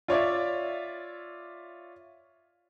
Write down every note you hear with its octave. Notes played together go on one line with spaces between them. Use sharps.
F4 C#5 D5 E5